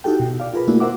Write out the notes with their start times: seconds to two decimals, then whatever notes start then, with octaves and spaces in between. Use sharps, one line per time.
0.04 D#4 E4 F#4 G4 A4 G5
0.20 B2
0.40 D5 F5
0.53 F4 G#4 A#4 B4
0.67 A3 A#3 D4 E4 F#4
0.80 A#4 C5 E5 F#5 D6